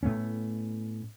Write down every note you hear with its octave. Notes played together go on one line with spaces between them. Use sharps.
A2 A3 B3 C#4